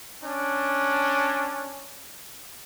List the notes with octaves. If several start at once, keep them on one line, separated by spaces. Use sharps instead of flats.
C#4 D4